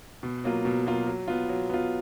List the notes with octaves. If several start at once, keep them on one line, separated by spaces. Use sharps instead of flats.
B2
F#3 A#3 F4
B2
F#3 A#3 F4
F#3
B3 F4
F#3
B3 F4